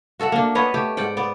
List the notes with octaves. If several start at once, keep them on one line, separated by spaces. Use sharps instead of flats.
F#4 A4 E5 F#5
A#3 D4
B3 B4 C#5 D#5
A3 G4
G#2 D5 F#5 G5
B3 D5